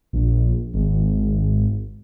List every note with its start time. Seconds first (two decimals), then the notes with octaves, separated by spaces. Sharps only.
0.13 A#1
0.74 G#1